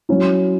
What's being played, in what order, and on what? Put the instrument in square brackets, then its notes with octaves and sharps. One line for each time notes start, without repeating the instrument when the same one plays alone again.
[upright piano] F#3 C#4 E4